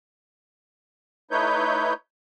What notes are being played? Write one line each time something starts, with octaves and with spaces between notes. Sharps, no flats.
A3 D#4 E4 B4 C#5 G6